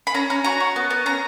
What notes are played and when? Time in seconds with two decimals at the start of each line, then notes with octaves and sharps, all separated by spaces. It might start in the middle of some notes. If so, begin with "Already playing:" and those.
0.07 B5
0.14 C#4 A#5
0.30 C#4 A#5
0.44 F#4 A#5
0.60 F#4
0.76 B3
0.90 B3
1.06 C#4 A#5